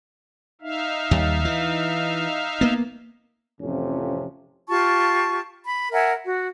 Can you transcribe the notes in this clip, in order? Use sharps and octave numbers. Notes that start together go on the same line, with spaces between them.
D#4 E5 F5
D#2 G3
E3
A#3 B3
A1 F2 C3 F3 C#4
F4 G4 A5 C#6
B5
A#4 E5 F#5 G#5
F#4